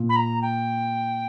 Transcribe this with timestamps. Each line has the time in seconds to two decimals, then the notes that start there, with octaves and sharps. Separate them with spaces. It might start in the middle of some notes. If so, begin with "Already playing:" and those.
Already playing: A#2
0.09 B5
0.16 A#5
0.42 G5